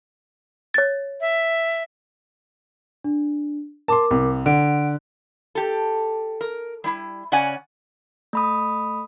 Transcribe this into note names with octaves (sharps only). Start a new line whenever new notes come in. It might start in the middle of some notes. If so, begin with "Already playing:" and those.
C#5 A6
E5
D4
A#4 A5 C6 D6
C2
D3 F#5 D7
G4 A4
A#4
G3 E4
C#3 C#4 D5 F#5 G#5
A3 B5 D#6